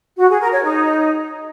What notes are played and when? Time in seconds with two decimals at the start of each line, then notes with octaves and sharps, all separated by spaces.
0.18 F#4
0.30 G#4
0.41 A#4
0.52 C#5
0.63 D#4